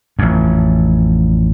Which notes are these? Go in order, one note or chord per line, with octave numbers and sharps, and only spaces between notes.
A1 F2